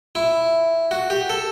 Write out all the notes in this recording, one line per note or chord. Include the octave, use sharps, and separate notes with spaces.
E4
F#4
G4
A4